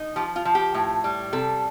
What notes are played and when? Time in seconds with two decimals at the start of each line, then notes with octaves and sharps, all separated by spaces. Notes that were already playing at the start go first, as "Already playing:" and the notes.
Already playing: D#4
0.16 F3 G4
0.36 F4
0.45 F3
0.55 G4
0.74 A2
1.04 G3
1.33 C3 A4